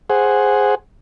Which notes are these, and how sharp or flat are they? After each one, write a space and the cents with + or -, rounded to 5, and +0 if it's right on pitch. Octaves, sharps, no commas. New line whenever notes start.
G#4 -5 C5 +0 F#5 +0